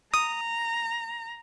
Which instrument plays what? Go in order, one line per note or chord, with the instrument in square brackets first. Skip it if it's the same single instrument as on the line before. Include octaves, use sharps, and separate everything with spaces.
[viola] A#5 [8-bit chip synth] D#6